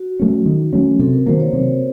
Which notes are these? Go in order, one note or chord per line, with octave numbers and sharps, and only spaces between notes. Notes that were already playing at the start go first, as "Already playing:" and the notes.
Already playing: F#4
F#3 A3 C#4
D#3
F#3 A3 C#4
C3 A4
A#4
D#3 F#3 A#3 C5
C#5
C3